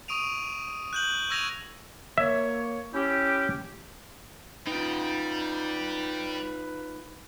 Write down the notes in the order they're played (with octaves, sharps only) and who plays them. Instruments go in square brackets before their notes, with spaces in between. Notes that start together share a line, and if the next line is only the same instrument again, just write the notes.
[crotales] C#6 D#6 D7 D#7 F7
F#6 G6 F#7
C#6 E6 G#6 A#6 D#7 F7
[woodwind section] A#3 C#5 [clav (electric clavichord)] E5
[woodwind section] C#4 E4 G4
[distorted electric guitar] G3 G5 [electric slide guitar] D#4 F4 [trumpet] B4